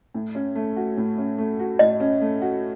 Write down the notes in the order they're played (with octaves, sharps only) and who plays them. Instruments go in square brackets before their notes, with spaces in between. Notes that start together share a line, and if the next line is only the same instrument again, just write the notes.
[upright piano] A2
C#4
A3
F#4
A2
C#4
A3
F#4
[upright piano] A2 [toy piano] D#5
[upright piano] C#4
A3
F#4